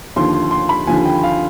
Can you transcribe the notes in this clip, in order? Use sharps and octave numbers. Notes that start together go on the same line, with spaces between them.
D#2 D3 F3 C6
C6
C6
B5
D#2 D3 F3 G#5
G5
F5